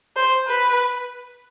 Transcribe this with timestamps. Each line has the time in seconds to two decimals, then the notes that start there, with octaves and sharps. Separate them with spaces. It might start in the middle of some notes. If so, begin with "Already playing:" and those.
0.16 C5
0.48 B4